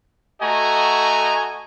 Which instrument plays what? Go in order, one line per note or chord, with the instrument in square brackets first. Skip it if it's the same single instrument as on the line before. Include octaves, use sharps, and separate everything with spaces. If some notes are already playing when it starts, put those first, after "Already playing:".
[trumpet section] A3 F#4 D#5 G#5 A#5